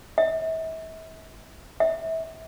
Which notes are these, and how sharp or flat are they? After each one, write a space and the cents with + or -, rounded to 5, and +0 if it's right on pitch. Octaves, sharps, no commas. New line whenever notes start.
E5 -35
E5 -25